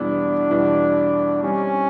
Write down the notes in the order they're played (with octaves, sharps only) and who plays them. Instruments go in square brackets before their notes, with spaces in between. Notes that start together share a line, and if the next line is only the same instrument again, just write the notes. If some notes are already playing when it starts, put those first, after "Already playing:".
Already playing: [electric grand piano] E2 B2 G3 B3 E4 [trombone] D4
[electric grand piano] E2 B2 G3 B3 E4
[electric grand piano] G3 C4 D#4 [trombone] C#4